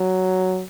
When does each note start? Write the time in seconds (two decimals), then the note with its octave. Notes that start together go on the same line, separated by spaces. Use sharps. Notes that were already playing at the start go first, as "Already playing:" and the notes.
Already playing: F#3